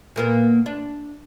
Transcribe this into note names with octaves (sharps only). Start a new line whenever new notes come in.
A#2 A#3 B3
D4